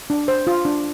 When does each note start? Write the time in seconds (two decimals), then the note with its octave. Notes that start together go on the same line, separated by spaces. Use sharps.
0.10 D4
0.28 C5
0.47 F4
0.65 D4